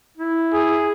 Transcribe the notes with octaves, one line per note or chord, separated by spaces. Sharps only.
E4
G#4